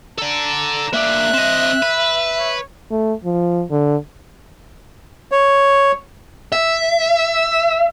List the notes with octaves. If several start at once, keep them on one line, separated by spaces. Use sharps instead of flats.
A4 D5 A#5
A#3 D4 E5 F#6
C4 D#5
B4
C#5
A3
F3
D3
C#5
E5